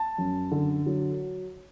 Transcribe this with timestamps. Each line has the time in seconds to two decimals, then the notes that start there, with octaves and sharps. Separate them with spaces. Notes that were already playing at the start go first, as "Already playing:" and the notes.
Already playing: A5
0.18 F#2
0.52 D3
0.86 F#3